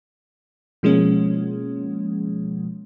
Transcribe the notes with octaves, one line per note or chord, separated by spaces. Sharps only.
B2 F3 G#3 A#3 C#4